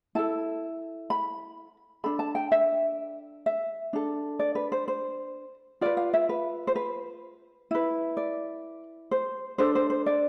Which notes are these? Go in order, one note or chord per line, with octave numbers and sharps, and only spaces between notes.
E4 A4 A5
B5
D4 A4 B5
A5
G5
E5
E5
D4 A4
D5
B4
C5
C5
F4 B4 D5
F5
E5
B4
C5
B4
E4 B4
D5
C5
D4 A4 C5
C5
C5
D5